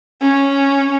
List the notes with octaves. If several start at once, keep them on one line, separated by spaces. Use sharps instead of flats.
C#4